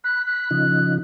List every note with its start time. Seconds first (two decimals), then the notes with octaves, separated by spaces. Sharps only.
0.04 B5 F#6
0.26 F#6
0.51 C#3 F3 D#4